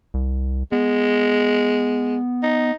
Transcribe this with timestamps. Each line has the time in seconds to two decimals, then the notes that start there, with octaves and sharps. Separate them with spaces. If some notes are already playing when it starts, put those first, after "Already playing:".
0.14 C2
0.72 G#3 B3
2.43 D#4